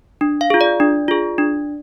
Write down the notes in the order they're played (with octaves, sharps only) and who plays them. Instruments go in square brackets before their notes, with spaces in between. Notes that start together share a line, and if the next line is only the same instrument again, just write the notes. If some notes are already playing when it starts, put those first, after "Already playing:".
[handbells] D4
F5
F4 G#4
D5
D4
F4 G#4
D4